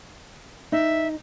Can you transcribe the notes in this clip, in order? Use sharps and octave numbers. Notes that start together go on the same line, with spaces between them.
D#4 E5